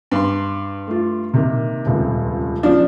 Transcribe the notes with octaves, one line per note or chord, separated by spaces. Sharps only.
G2 C6
A3 F4
C3 D#3 A#3
D#1 C#2 C3
C#3 F3 D4